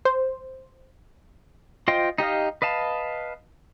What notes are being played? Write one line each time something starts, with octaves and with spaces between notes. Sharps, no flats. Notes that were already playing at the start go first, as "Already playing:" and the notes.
C5
F4 C5 D#5 G5 C6
D#4 G4 D#5 F5
B4 D#5 F5 A5